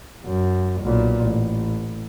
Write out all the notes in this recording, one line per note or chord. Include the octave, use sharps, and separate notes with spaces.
F#2
B1 A#2
A1